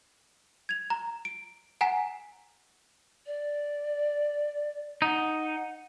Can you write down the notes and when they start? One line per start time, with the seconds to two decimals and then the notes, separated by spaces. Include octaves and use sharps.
0.69 G#6 F7
0.90 A#5
1.25 D7
1.81 F#5 G#5 A#5 B6
3.27 D5
5.02 D#4 F#5